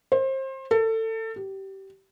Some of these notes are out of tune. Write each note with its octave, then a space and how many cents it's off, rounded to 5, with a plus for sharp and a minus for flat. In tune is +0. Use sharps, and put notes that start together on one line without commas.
C5 +30
A4 +25
G4 -20